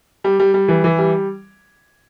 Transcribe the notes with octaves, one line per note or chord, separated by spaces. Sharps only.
G3
G3
G3
E3
E3
G3